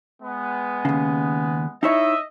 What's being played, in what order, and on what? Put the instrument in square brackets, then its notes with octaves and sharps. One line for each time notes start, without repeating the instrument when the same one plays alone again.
[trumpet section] G#3 B3
[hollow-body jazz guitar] D#2 C#3
[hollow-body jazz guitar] D#4 E4 C#5 [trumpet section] D#5 E5